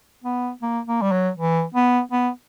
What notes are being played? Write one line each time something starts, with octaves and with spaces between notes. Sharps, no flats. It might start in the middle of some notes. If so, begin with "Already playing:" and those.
B3
A#3
A#3
G3
F#3
E3
B3
B3